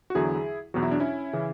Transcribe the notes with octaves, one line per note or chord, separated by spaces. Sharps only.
F#4
E2 D3 F#3 E4 G#4
E2 B2 F#3 F#4
E4
D4
C#4 E4
C#3 E3